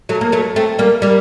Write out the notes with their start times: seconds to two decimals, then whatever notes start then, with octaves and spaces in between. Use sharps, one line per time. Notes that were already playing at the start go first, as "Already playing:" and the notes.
0.09 F#3 A3
0.21 A#3
0.32 F#3 A3
0.56 A3 C4
0.79 G3 A#3
1.02 G3 A#3